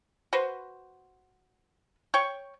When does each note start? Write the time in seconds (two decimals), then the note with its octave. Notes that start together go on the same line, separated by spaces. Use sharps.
0.33 F#4 B4 C5
2.14 C#5 G5 C#6